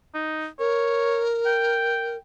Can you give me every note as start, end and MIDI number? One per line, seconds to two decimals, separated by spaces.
0.14 0.47 63
0.59 2.17 70
0.59 1.23 73
1.46 2.19 79